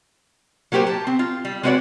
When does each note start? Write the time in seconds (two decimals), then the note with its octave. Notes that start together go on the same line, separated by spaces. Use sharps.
0.72 F#3 A#3 G4 A#4 C5
0.87 A5
1.07 C4
1.19 F4
1.45 G3
1.63 G#3 C4 F#4 B4 C#5 D5